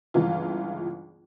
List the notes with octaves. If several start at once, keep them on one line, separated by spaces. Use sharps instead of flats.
G1 C#2 E3 F4